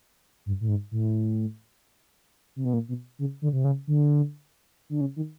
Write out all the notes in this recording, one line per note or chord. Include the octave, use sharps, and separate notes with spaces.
G2
A2
G#2
A2
C3
B2
A#2
B2
C#3
D3
C3
C#3
D3
D3
C#3
D#3